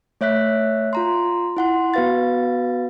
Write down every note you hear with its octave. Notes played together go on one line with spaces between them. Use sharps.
A3 C#5 E5 F#6 B6
F4 A#5 C6
E4 F#5 C6
B3 F#4 B4 F5 A6